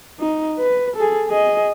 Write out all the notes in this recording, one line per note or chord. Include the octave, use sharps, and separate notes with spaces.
D#4
B4
G#4 A4
G#4 D#5